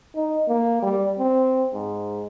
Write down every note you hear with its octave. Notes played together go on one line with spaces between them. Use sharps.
D#4
A#3
G3
C4
G#2